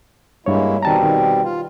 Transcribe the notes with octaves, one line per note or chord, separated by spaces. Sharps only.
G2 G#3 A#3 E4 C#5
B2 D#3 G3 C4 A5 A#5
D#3
F4